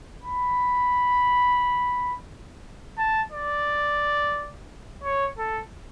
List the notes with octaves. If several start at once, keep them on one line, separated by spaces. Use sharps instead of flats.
B5
A5
D5
C#5
A4